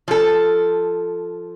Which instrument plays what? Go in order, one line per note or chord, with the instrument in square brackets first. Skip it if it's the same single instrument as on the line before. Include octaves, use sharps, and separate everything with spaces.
[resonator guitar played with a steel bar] F3 A4